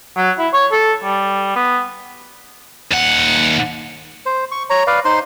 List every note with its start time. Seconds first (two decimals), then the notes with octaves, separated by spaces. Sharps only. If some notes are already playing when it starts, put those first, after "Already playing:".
0.17 F#3
0.39 E4
0.54 C#5
0.72 A4
1.04 G3
1.56 B3
2.91 D#2 F#5
4.26 C5
4.51 C#6
4.70 C#5 A#5
4.87 B4 D5 F5
5.05 D#4 C5 C6